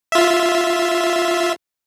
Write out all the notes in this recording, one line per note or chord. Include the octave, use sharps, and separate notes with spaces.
F4 E5